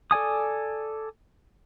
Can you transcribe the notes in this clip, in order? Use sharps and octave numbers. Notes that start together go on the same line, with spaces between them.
A4 D5 G#5 D#6